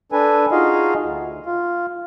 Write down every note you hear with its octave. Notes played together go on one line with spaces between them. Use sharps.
D4 A4 B4 G#5
D#4 F4 F#4 G#4 D#5 F5
D2
F4